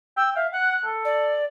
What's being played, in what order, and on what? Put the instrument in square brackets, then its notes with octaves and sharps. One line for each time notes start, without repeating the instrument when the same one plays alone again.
[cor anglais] G5 [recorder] E6
[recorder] E5 [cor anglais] F5
[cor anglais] F#5 [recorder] F#6
[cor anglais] A4
[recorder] D5